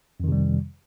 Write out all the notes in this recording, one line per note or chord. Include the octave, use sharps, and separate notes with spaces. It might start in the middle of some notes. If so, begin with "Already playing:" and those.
F2 C3 D#3 G3